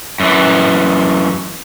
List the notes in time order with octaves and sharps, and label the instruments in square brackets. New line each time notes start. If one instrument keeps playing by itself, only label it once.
[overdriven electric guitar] F#2 E3